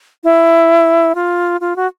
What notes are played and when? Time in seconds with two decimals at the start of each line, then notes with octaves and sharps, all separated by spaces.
0.24 E4
1.15 F4
1.61 F4
1.76 F#4